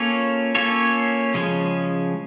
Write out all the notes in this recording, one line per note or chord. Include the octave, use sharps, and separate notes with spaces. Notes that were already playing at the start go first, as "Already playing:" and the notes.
Already playing: A#3 C#4 F4 A4 C#5
A#3 C#4 F4 A4 C#5
C#3 F3 G#3 C#4